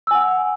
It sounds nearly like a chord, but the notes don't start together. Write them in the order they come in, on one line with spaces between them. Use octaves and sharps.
E6 G#5 F#5